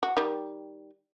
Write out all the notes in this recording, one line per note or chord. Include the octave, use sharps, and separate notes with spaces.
F#4
D#3 G3